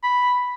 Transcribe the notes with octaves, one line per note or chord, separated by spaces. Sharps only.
B5